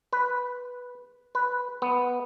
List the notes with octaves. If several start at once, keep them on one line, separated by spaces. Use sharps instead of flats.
B4
B4
B3